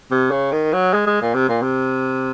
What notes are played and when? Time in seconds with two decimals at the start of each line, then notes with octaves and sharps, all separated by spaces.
0.11 C3
0.31 C#3
0.52 D#3
0.73 F#3
0.94 G#3
1.07 G#3
1.22 A#2
1.34 C3
1.49 A#2
1.62 C3